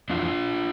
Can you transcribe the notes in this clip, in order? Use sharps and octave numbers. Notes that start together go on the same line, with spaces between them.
F2 E3 D4 F4